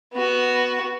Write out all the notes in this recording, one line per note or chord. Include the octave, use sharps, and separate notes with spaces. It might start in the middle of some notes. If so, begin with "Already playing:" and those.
B3 F#4